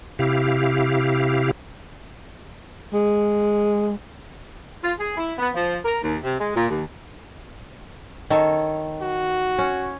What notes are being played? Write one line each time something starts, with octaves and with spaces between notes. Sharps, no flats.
C3 E4 G4 F5
G#3
F4
G#4
E4
B3
F3
A#4
D#2
C3
G#3
A#2
D#2
D#3 A4 C#5
F#4
C#4